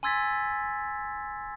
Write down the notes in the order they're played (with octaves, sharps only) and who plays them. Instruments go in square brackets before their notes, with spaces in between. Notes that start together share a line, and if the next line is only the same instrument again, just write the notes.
[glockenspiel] G#5 C6 E6 G#6 A6 B6